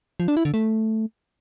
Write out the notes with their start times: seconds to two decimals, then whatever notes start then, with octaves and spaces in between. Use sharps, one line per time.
0.20 F3
0.28 D4
0.37 E4
0.45 D3
0.54 A3